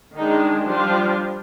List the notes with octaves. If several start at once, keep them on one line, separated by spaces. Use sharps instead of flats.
D#3 G#3 D4 D#4
F3 G3 D4 F4